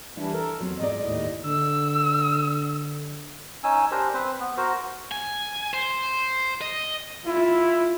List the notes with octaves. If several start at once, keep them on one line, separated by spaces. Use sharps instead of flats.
E3 G3 D4 E4
A4 A#4
E2 F#3 C4
G#2 D5 D#5
D#2 A2 D#5
D3 E6
C#4 D#4 G#5 E6
D4 G4 A#4 C5
C4 B4 C5
B3
F#4 A#4 C5
G#5
C5
D#5
E4 F4